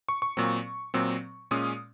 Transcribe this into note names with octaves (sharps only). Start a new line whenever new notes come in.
C#6
C#6
A#2 F#3 C4
A#2 F#3 C4
A#2 G#3 C#4 D#6